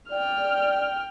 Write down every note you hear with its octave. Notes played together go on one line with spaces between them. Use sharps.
D5 G5 F6